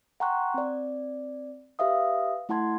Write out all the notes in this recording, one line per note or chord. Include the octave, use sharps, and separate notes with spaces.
F#5 G5 A#5 C6 C#6 F#6
C4 D5
G4 B4 E5 F5 D#6
A3 E4 F#5 A5 C6 G#6